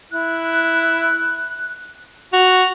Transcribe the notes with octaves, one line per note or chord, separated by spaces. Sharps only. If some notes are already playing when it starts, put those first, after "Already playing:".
E4 F#6
F#4 F7